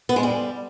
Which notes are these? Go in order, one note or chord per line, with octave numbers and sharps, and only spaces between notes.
B3
G#3
G3